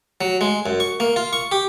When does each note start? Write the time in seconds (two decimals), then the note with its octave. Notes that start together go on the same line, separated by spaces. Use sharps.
0.21 F#3
0.41 G#3
0.66 F#2
0.80 C#6
1.00 A#3
1.16 F4
1.33 C#6
1.52 G4